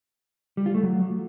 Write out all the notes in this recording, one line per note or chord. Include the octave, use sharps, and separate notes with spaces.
G3
F4
A3
F#3